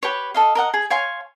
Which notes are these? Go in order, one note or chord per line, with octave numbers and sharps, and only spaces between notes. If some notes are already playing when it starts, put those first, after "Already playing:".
G4 B4 C#5
A4 D#5 F5
A#4 D#5 F#5
G#4
C#5 F5 G#5 C6